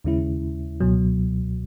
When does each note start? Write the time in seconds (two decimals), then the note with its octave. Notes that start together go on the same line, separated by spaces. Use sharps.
0.04 D#2 C#3 G#3 C#4 E4
0.80 C#2 B2 F#3